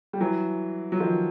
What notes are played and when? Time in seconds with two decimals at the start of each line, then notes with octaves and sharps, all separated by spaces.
0.13 G3
0.21 E3 F#3
0.92 F#3
1.00 D#3 F3